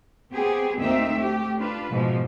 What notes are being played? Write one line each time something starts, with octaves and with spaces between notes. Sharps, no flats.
B3 C4 G4 G#4
D2 A#3 C4 D#4 E5
A3 G4
D4 F4 B4
G#2 B2 E3 F3